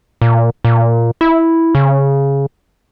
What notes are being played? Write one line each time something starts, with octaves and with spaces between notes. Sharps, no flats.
A#2
A#2
E4
C#3